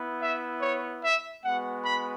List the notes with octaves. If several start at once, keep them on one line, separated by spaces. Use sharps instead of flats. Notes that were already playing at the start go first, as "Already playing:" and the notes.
Already playing: B3 E4
E5
C#5
E5
G#3 B3 F#4 F#5
B5